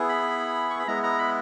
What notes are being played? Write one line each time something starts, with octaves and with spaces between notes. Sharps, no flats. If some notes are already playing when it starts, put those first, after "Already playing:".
Already playing: B3 E4 G#4
B5
C#6
B5
G#3 B3 E4 A#5
A#5
B5